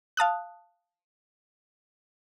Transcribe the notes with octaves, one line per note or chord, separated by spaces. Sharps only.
F5 A5 D#6 F#6